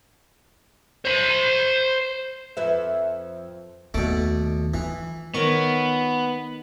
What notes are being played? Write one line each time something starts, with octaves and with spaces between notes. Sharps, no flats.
C5 B5
F2 B4 E5
D#2 B2 A3 D5
E3 F4
D#3 B3 A#4 C#5 C#6